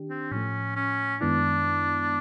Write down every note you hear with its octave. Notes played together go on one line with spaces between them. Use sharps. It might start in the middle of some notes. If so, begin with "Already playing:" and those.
Already playing: D#3 D4 G4
C4
A2 F3 A3 C#4
C#4
F#2 D#3 G#3 B3 D4 E4